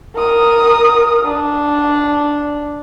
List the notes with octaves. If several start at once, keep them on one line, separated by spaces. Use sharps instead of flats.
A#4 D#6
D4